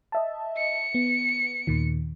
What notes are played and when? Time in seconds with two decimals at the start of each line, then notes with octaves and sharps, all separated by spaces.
0.12 D#5 E5 A5
0.57 C#7
0.95 B3
1.67 D#2 A#2 D#3